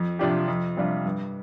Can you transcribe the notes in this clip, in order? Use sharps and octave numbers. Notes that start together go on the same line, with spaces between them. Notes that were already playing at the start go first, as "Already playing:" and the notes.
Already playing: F2
C3 F3 D4 G4
F2
C3 G3 D4 F4
G2